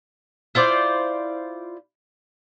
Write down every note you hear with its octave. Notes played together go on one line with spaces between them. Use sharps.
E4 F4 C5 D5